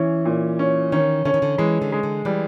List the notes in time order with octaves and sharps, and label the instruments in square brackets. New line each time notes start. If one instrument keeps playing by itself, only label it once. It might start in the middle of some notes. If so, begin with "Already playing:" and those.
Already playing: [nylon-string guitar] E3 [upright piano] C#4
[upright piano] A#2
C#4
[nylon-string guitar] D#3 [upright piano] C#4
[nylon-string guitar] D3 [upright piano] C#4
[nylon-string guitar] D#3
D3
[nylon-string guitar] E3 [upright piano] G#3
[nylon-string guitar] D3
[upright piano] G#3
[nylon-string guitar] D3
[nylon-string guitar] E3 [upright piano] G3